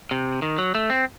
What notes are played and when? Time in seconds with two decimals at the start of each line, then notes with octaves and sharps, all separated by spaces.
0.11 C3
0.42 D#3
0.58 F#3
0.75 A3
0.90 C4